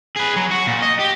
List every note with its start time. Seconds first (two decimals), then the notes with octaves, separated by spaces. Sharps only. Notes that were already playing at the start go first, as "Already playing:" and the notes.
0.17 G#4 B4
0.37 F#3
0.51 F#4
0.67 A#2
0.82 D#5
1.00 G4